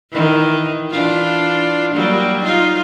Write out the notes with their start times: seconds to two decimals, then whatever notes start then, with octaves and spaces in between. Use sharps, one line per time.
0.11 D#3 E3
0.91 E3 D4 F4
1.94 F#3 G3 A#3
2.43 D#4 F4